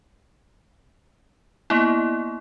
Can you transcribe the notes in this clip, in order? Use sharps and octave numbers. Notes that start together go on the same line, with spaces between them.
A#3 B3 E4